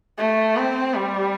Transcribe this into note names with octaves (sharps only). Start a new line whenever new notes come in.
A3
C4
G3